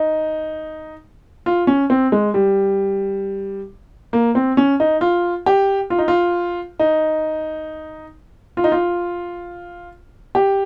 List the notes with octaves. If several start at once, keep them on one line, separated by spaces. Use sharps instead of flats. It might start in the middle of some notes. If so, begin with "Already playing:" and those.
Already playing: D#4
F4
C#4
C4
G#3
G3
A#3
C4
C#4
D#4
F4
G4
F4
D#4
F4
D#4
F4
D#4
F4
G4